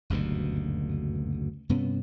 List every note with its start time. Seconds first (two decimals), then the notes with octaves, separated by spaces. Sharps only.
0.10 F#1 D2 G2 B2
1.69 G2 C3 B3 C#4